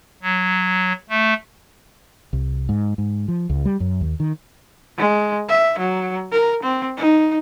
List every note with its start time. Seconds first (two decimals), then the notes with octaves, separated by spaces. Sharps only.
0.22 F#3
1.10 A3
2.33 C2
2.69 G#2
2.98 G#2
3.28 F3
3.50 C#2
3.65 G3
3.80 F#2
4.01 D#2
4.20 D#3
4.98 G#3
5.49 E5
5.79 F#3
6.32 A#4
6.63 C4
6.97 D#4